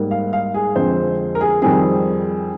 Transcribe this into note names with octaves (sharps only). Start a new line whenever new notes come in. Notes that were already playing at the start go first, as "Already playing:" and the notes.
Already playing: G#2 G3 A#3
F5
F5
G#4
F2 D3 G#3 C4 C5
A#4
G#4
F2 D#3 G3 C4 G#4